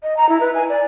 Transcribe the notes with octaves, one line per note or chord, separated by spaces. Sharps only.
D#5
A#5
E4
B4
G#5
D5